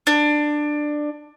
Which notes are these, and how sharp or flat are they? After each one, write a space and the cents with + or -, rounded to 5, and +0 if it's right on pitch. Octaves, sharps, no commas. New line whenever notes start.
D4 +15